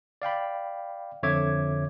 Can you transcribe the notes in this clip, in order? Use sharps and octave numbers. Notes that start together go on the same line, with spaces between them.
D5 F5 G5 B5
F2 D3 C#5 E5 D6 G#6